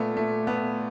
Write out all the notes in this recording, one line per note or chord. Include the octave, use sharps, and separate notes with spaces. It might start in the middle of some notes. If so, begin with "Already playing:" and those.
Already playing: A#2 A3 B3
A3
A3 B3